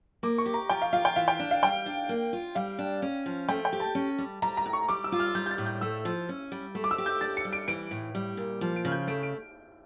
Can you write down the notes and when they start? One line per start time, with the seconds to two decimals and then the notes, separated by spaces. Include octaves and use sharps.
0.23 A#3 D6
0.38 C#6
0.46 G4
0.54 A#5
0.69 F3 G5
0.82 F5
0.93 F4 F5
1.05 G5
1.16 E3 F5
1.28 G5
1.39 D4
1.51 F5
1.62 G3 G5
1.86 D4
2.09 A#3
2.33 F4
2.55 G3 F5
2.79 D4
3.02 C#4
3.26 F3
3.48 A3 G5
3.65 G5
3.73 G4
3.80 A5
3.95 C#4
4.18 G3
4.42 G3 A#5
4.57 A#5
4.66 A2
4.73 C#6
4.89 G3 D6
5.04 E6
5.12 F4
5.19 F6
5.35 G3 G6
5.46 G6
5.51 A6
5.58 A2
5.66 G6
5.81 A3 E6
6.05 F3
6.29 C#4
6.52 G3
6.75 A3
6.84 D6
6.91 E6
6.98 G4
7.06 G6
7.21 D4 A6
7.37 C#7
7.45 G3
7.53 D7
7.68 E3 D7
7.91 A2
8.15 G3
8.37 A#2
8.61 F3
8.76 D7
8.85 C#3 F6
8.92 G6
9.07 A3 D7
9.23 D7